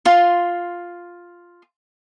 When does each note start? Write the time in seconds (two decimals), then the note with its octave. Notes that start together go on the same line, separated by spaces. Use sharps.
0.05 F4 C6